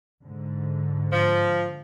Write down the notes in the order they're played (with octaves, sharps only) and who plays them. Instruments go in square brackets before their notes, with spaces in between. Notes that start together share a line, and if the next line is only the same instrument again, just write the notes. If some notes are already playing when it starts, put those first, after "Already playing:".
[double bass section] G#2 D3
[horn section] F3